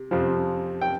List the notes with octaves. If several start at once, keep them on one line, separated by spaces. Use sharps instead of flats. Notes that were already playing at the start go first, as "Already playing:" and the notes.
Already playing: C3
F2 C3 F3
G5